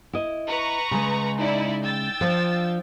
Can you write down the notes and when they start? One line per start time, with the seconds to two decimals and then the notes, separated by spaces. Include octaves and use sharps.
0.13 E4 D#5
0.46 B4 A#5 C#6
0.91 C#3 G#3
1.38 D#4 E4 D5
1.84 G5 E6 A6
2.21 F3 D4 F4